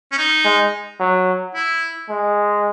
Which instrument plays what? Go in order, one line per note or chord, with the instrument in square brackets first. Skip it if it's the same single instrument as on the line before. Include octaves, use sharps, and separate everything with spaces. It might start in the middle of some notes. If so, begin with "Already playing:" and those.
[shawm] C#4
D#4
[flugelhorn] G#3
F#3
[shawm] E4
[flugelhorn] G#3